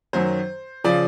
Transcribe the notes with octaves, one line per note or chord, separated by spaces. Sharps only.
F#2 D#3 F#3 C5
C#3 F3 D5